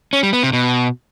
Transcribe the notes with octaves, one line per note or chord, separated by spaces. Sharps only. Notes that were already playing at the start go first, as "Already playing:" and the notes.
C#4
G3
B3
C3
B2